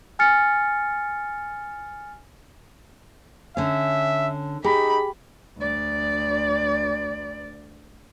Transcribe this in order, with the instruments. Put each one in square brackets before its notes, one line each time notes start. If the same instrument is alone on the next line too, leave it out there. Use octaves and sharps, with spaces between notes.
[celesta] G#5 F6 A6 C#7
[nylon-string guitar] D3 C#4 [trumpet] E5
[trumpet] D#4 [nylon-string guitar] G4 [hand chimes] G#4 [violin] B5
[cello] D2 D5